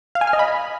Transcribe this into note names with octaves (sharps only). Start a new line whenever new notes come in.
F5
G#5
F6
D#5
B5